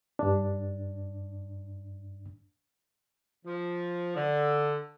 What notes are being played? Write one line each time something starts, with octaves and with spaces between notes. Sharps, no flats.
G2 D4
F3
D3